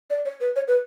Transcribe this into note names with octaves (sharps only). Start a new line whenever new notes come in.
D5
C#5
B4
C#5
B4